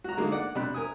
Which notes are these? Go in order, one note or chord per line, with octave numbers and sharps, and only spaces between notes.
F#4 A#5
D3 G#3 A#3 D#4
D5 F#5
C3 D4 B5 F#6
A#4 G#5 D#6